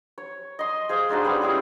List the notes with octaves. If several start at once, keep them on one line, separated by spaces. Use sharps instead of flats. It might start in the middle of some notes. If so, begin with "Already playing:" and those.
C#5
D#5 C6
G#4 C5 F5
G#3 D4 D#4 F#4
G3 B3 C#4 G4
C4 C#4 E4 G#4